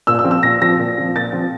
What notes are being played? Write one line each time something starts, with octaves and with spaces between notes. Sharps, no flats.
A#2 E6
E6
F3 C4
E6
A#2 A#6
F3 C4 A#6
A#2
F3 C4
A#2 A6
F3 C4